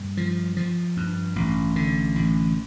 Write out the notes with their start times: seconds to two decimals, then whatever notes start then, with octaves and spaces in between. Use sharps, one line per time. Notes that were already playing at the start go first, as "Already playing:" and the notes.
Already playing: G2
0.17 F3
0.57 F3
0.97 G2
1.36 A1
1.76 D3
2.16 A1